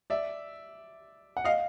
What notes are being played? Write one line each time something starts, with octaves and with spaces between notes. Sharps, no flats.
D5 E5
F#5
D#5 F5